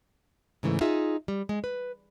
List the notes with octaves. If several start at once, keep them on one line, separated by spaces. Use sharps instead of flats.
G#2 C#3 E3 G#3 A3
D#4 F4 G#4 E5
G3
G#3
B4